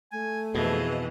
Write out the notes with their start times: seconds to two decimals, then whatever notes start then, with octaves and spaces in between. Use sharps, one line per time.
0.12 A3 G#5
0.55 F2 B2 E3 G#4 D#5